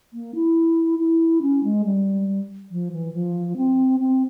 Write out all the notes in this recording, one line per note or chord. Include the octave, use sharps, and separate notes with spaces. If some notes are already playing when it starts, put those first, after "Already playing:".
A#3
E4
E4
C#4
G#3
G3
F3
E3
F3
C4
C4